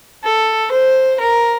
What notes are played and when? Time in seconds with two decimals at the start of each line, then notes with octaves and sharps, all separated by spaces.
0.24 A4
0.72 C5
1.20 A#4